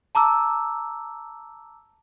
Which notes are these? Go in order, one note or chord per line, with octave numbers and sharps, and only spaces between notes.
A5 A#5 D6 E6